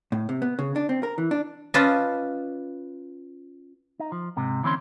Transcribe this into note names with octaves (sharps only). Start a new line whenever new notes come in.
A2
C3
B3
C#3
D4
C4
A#4
E3
D4
C#4 F4 B4 D5 D#5 A5
D#4
F3
G#2 C3
D2 E3 C4 C#4 C6